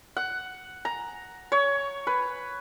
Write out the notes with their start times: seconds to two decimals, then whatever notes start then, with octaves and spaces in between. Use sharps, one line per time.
0.17 F#5
0.85 A#5
1.52 C#5
2.07 B4